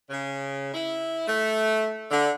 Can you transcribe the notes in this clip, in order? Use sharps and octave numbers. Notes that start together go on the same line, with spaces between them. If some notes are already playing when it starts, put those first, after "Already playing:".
C#3
E4
A3
D3